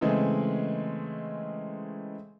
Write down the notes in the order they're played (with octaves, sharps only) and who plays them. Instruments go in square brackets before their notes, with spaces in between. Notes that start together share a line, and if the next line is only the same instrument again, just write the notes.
[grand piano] C#3 E3 G#3 A3 C4 G#4